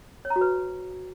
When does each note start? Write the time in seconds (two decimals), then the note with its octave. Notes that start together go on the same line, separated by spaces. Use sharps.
0.25 C#5
0.30 A#5
0.36 F#4
0.41 B4